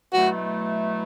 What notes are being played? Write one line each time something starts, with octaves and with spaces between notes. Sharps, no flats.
B2 F#3 A3 E4 F#4